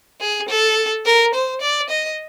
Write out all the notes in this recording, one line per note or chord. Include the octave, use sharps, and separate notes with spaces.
G#4
A4
A#4
C5
D5
D#5